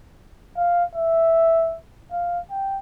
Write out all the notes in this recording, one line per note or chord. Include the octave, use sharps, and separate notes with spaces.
F5
E5
F5
G5